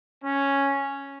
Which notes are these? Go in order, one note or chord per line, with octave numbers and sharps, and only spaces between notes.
C#4